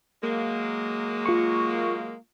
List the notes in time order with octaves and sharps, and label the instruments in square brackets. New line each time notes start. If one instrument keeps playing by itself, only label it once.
[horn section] F#3 G#3 A#3
[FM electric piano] F4 C#6